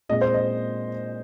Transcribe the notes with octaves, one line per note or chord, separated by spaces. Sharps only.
A#2 G#3 C4 D#5
C5
D#5